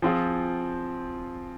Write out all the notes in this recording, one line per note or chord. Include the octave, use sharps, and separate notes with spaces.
F3 C4 F4 G#4